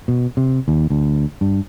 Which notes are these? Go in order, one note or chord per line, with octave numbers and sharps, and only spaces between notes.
B2
C3
D#2
D2
G2